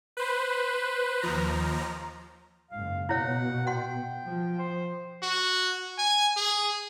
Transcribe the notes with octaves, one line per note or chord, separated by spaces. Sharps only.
B4 C5
D#2 F3 A#5
F#1 G#2 F5
B2 E4 C#5 F5 F#5
F#5 G5 C6
F3
C5
F#4
G#5
G#4